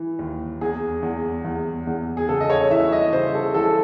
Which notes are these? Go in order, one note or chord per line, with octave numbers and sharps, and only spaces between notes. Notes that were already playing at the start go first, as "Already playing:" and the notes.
Already playing: E3
D#2
E2 G#4
E2
E2
E2
G#4
C#3 A4
D#5
C#5
E3 E5
D#5
C#3 C5
A4
E3 A4